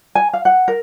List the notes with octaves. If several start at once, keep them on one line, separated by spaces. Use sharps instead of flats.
G#5
F5
F#5
A#4